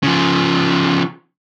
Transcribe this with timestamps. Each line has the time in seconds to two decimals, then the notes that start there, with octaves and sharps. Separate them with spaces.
0.03 C#3 F3